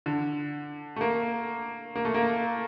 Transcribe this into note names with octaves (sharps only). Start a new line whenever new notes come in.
D3
A3
A#3
A#3
A3
A#3